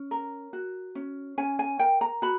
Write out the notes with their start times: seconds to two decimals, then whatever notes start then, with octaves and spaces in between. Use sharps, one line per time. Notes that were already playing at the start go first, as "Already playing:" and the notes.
Already playing: C#4
0.11 A#4
0.53 F#4
0.95 C#4
1.38 C#4 G#5
1.59 G#5
1.79 A#4 G5
2.01 A#5
2.22 F#4 B5